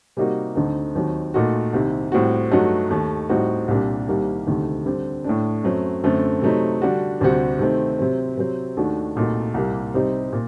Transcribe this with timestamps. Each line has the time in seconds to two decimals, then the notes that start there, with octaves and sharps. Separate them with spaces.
0.17 C3 G3 A#3 D#4 F#4
0.55 D2 D3 A3 C4 D#4
0.95 D#2 D#3 F#3 C4
1.34 A#2 A3 D#4 F#4
1.73 C2 C3 D#3
2.12 A2 G3 C4 F#4
2.51 G2 F#3 A3 D#4 F#4
2.90 D#2 D#3 A3
3.29 A2 G3 C4 D#4 F#4
3.68 C2 A#2 G3 D4
4.08 C2 C3 D#3 G3 A#3
4.46 D2 C3 D#3 A3
4.86 D3 G3 C4
5.24 A2 A3 D4
5.63 F#2 F#3 A3 C4
6.04 F#2 D3 A3 C4
6.42 C3 F#3 A3 C4 D#4
6.82 D3 G3 D4 F#4
7.21 D2 C3 G3 C4 F#4
7.59 C3 D#3 A3 C4
7.99 C3 F#3 C4
8.37 C3 F#3 C4
8.77 D#2 D#3 A3 D4 F#4
9.16 C2 A#2 A3 D#4 F#4
9.54 C2 A#2 G3 A#3
9.94 C3 G3 C4 D#4
10.33 A#2